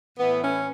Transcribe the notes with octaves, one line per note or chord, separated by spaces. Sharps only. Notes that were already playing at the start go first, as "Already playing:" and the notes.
A2 E3 B3
C#4